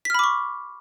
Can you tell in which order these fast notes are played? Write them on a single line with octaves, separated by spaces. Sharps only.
B6 F6 B5 D6 C#6